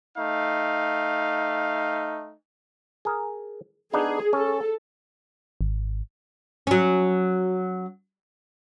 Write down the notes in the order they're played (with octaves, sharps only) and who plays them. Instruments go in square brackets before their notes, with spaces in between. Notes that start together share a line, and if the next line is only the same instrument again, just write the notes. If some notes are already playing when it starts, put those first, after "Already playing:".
[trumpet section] A3 D#4 F5
[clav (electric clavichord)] G#4 A#4
[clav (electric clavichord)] B3 D4 D#4 [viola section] G#4
[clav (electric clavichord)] C#4 [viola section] A4
[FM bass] G#1
[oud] F#3 C#4